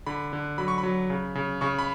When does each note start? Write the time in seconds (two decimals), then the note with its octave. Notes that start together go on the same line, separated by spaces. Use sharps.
0.07 D3 B5
0.33 D3
0.58 F#3 B5
0.68 C#6
0.78 B5
0.83 F#3
1.10 C#3
1.35 C#3
1.61 C#3 C#6
1.79 B5